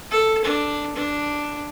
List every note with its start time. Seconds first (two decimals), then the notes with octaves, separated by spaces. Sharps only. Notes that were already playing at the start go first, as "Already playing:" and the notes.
0.10 A4
0.44 D4
0.95 D4